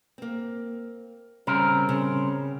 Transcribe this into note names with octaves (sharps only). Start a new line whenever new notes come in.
A#3 C4
C#3 G3 C4 A#4
C#3